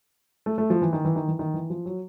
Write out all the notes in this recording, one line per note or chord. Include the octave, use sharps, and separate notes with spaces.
A3
A3
F3
E3
D#3
E3
D#3
E3
D#3
E3
F3
F#3